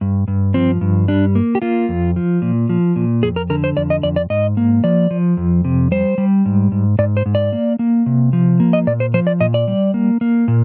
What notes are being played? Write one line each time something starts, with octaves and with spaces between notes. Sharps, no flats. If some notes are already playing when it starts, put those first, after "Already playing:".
G2
G2
F3 C4
G2
G3 D4
A#3
G4
A#3 F4
F2
F3
A#2
F3
A#2
F2 G#4
A#4
D3 A#4
C5
F2 D5
D#5
F2 D5
D5
G#2 D#5
A#3
F3 D5
F3
F2
C3
G3 C5
G3
G#2
G#2
G#2 D5
C5
G#2
D5
A#3
A#3
C3
F3
A#3
D#5
A#2 D5
C5
F3 C5
D5
A#2 D#5
D5
G3
A#3
A#3
A#2